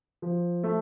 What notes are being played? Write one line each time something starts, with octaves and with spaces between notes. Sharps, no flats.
F3
A3